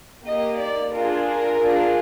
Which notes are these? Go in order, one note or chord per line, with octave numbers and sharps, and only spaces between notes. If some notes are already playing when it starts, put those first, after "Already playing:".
A#3 D#4 G4 D#5
D5
D4 F4 G#4 A#4
A#4
D4 F4 G#4